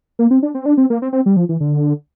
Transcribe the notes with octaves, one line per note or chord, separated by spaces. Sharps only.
A#3
C4
D4
C4
D4
C4
A#3
C4
C4
G3
F3
E3
D3